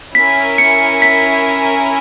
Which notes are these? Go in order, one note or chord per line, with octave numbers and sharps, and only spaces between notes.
C#4 E4 A#4 E5 G#5 B6
C#7
B6